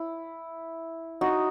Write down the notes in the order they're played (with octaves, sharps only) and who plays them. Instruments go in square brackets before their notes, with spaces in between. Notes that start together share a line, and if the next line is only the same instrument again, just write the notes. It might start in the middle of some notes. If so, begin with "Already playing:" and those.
Already playing: [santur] E4
D#4 F#4